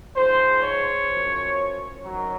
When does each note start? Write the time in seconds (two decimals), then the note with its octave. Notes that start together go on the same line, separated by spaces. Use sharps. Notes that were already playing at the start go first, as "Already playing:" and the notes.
0.14 G#2 F3 C5
0.61 C#5
1.09 F#2 F3
2.04 F#2 D#3 F#3